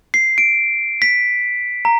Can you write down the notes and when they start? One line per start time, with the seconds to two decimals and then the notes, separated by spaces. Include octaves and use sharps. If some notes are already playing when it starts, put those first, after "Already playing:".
0.14 C7
0.38 D7
1.02 B6
1.85 A#5